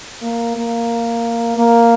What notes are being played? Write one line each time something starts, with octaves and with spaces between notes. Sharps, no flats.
A#3
A#3
A#3